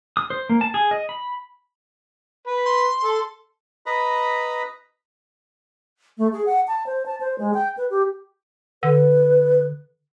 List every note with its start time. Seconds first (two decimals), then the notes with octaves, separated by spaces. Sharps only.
0.17 D#6
0.30 C5
0.50 A#3
0.61 A5
0.74 G#4
0.91 D#5
1.09 B5
2.47 B4
2.65 C6
3.05 A4
3.86 B4 D#5 A#5 B5
6.18 A3
6.33 G#4
6.46 F#5
6.68 A5
6.86 C5
7.06 A5
7.21 C5
7.38 G#3
7.54 G5
7.78 B4
7.90 G4
8.83 D3 B4